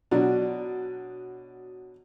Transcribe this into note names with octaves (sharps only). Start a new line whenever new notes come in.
B2 F#3 D4